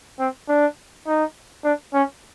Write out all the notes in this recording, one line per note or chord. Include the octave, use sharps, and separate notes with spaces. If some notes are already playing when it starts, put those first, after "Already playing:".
C4
D4
D#4
D4
C#4